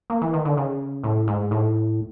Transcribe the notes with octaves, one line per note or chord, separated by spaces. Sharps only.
A#3
E3
D#3
D3
C#3
A2
G#2
A2